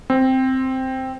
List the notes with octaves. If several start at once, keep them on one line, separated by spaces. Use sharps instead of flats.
C4